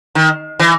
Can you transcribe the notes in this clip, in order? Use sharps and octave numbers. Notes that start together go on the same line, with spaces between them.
D#3
E3